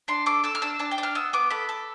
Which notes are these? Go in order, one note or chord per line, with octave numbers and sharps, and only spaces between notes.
D4 C6
A4 D6
A4 E6
F6
D4 E6
D4 A5
G5
D4
F6
B3 E6
B3 D6
A4 B5
A4